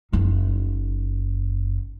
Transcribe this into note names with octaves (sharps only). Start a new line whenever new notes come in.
F#1 D#4